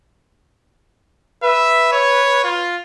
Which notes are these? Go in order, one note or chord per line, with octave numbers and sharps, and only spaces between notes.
B4 E5
C#5
F4